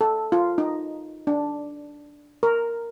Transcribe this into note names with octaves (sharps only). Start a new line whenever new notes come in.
A4
F4
D#4
D4
A#4